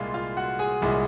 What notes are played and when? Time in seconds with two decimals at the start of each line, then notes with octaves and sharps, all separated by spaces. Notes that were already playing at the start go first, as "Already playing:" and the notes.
Already playing: C2 A#2 G#3 F4 F5
0.14 F4 F5
0.37 F#4 F#5
0.59 G#4 G#5
0.82 C2 A#2 G#3